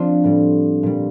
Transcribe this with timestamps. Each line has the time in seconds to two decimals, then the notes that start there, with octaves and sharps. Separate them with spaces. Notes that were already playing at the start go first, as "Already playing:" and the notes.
Already playing: F3 C4 D4 F4
0.24 A2 G3
0.83 A#2 G3